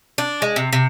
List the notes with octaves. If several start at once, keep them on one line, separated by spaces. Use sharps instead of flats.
D4
G#3
C3
C3